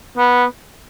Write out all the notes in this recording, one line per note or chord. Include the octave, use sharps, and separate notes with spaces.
B3